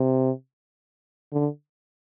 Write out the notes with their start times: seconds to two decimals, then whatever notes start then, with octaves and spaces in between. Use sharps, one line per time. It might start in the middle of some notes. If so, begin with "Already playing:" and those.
Already playing: C3
1.32 D3